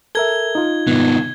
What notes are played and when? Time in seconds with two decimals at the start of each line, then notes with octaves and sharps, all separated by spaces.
0.15 A4 A#4 E5 G#6 G7
0.55 D#4 F4
0.87 C2 G#2 D#3 B3